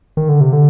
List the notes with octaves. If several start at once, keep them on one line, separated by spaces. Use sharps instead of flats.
D#3
D3
C3
D3